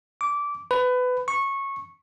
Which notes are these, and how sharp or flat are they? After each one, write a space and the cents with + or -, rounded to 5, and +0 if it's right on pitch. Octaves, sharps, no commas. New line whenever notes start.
D6 -15
B4 +20
C#6 -15